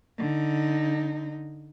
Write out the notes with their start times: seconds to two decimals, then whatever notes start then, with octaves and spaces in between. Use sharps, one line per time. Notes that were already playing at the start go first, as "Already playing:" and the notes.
0.18 D3 D#4